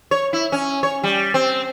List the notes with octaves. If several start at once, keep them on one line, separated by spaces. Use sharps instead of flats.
C#5
E4
C#4
C#5
G3
C4